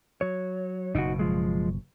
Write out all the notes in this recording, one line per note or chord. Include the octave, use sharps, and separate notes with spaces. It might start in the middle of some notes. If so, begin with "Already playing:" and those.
F#3 C#5
F#1 B2 D#4 F#4
F3 G#3